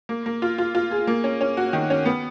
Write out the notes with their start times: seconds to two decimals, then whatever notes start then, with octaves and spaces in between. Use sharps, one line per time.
0.09 A#3
0.26 A#3
0.42 F4
0.58 F4
0.75 F4
0.91 G#4
1.07 A#3
1.24 C#4
1.41 C#4
1.57 F#4
1.73 D#3
1.90 C#4
2.05 B3